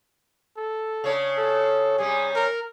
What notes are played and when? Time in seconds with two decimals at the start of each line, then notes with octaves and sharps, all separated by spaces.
0.57 A4
1.04 C#3 D4 C#5
1.37 A4
1.99 C3 G3 C#4 G#4
2.36 A#4